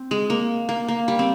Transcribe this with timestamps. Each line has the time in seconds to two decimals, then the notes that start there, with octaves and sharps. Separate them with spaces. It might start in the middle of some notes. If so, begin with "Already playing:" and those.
Already playing: C4
0.11 G#3
0.30 A#3
0.69 A#3
0.88 A#3
1.08 G3
1.19 C4